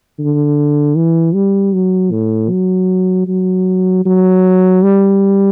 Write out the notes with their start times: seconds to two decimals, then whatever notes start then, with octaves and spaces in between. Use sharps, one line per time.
0.19 D3
0.96 E3
1.34 G3
1.73 F#3
2.12 A2
2.50 F#3
3.28 F#3
4.06 F#3
4.83 G3